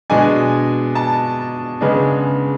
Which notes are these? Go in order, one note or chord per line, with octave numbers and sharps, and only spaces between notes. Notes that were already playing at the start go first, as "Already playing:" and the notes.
B2 G#3 D4 G#5
A5
C#3 G#3 B3 D4